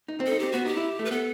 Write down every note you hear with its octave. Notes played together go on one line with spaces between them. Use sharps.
D#4
C4
A4
D#4
C4 G4
B3 F#4
D#4 G4
E4
A3
B4
B3 A4